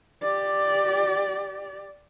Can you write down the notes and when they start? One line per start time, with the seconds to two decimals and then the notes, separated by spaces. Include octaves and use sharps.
0.22 G4 D5